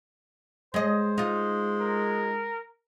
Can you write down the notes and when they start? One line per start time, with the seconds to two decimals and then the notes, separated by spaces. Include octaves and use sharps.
0.74 G#3 C5 D#5
1.18 G#3 D#4 F4
1.81 A#4